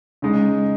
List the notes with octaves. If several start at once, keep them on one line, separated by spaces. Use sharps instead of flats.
C#3 G#3 D#4